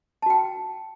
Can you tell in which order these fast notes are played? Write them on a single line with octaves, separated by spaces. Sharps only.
A5 F#4 G5